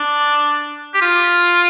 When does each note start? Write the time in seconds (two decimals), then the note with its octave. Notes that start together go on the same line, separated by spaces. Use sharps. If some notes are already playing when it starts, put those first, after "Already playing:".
Already playing: D4
0.94 G4
1.02 F4